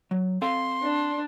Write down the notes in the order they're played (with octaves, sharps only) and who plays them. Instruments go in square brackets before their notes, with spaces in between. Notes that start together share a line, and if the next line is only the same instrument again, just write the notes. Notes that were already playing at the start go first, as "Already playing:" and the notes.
[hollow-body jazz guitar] F#3
[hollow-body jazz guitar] C4 A4 F5 [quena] C6
[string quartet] D4